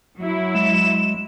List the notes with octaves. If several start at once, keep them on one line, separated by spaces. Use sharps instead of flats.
F#3 E4
G#3 E7